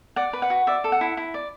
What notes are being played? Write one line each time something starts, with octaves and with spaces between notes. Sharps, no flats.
D5 F#5
B4
F#5
F#4
D5 E5
A4
F#5
E4
E4
D5